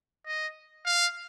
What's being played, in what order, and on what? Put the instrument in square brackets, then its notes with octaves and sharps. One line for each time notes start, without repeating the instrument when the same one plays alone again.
[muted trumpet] D#5
F5